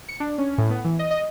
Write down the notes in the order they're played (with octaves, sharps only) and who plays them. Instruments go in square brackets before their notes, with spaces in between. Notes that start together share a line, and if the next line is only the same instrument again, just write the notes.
[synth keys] C#7
D4
C#4
A2
B3
E3
D#5
D#5